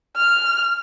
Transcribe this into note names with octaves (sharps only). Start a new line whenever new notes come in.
F6